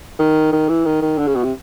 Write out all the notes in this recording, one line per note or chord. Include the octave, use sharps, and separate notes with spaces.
D#3
D#3
E3
D#3
D#3
D3
C#3
B2
C3